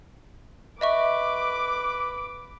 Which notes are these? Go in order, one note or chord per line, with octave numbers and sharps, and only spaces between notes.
B4 D#5 E5 C#6 D6